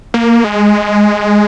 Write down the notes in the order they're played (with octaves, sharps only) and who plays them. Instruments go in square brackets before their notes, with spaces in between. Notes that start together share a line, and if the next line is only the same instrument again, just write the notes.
[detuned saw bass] A#3
G#3